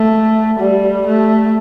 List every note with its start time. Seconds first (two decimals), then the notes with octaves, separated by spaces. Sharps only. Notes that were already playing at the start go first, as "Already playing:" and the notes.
Already playing: A3
0.60 G3
1.07 A3